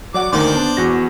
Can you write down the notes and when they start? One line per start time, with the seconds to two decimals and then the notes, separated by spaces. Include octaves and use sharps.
0.14 F#3 D5 F#5 D6
0.32 D2 D#3 A#3 C5 D5
0.54 B3 D4 A5
0.77 E2 F#4 A#6